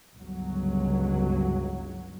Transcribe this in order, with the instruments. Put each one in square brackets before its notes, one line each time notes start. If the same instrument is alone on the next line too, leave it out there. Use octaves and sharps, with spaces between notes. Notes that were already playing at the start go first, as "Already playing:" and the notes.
[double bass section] G1 C#2 F#3